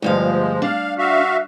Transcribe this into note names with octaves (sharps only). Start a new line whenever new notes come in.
D2 G2 F3 G#3 F5
D4 F5
F#4 E5 F5